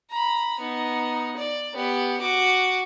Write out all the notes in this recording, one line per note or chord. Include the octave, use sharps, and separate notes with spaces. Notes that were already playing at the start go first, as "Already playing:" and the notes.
A#5 B5
B3 D#4
D5
B3 G4
F#4 D6